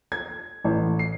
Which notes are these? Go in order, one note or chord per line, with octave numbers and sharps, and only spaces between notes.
G#6
A1
C7